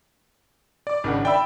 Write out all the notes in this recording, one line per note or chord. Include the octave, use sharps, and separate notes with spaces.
D5 D6
G#1 C#3 D4 F#5
D5 E5 G5 B5 E6